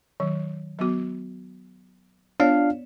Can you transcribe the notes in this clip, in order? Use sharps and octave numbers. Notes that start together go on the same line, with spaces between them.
D#3 F#3
F#3 B3 F#4
B3 D4 F4 C#5 D5 F5